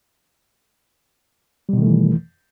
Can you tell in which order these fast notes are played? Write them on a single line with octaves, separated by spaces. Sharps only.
G3 B2 D#3 A3 E3